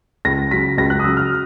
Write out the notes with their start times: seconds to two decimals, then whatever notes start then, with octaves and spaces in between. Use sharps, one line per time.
0.25 C#2 A#6
0.51 C#3 F#3 B6
0.78 C#2 A#6
0.90 F#6
0.99 D#6
1.04 C#3 F#3 E6
1.17 F6